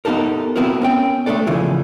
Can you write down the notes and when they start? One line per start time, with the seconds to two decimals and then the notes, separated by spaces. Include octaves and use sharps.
0.05 B3 D#4 G4 A4 A#4
0.56 B3 C4 E4 F#4 A#4
0.82 B3 C#4 G5
1.26 A3 B3 D4 A4 D5
1.47 C#3 E3 F3 A3 G#4